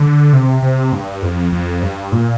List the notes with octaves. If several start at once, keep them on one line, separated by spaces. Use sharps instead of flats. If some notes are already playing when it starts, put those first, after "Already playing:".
Already playing: D3
C3
C3
G2
F2
F2
G2
A#2